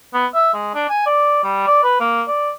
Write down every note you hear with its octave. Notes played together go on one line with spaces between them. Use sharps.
B3
E5
G#3
D4
G#5
D5
G3
D5
B4
A#3
D5